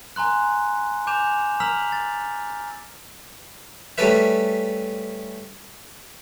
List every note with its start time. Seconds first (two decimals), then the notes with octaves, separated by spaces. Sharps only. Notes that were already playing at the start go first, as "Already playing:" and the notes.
0.16 G#5 A#5 C6 F#6
1.07 G#5 D6 G6 E7 F7
1.60 A#5 E6 F6 B6 F7 F#7
1.92 A6
3.98 G3 A3 C#4 A4 B4 E5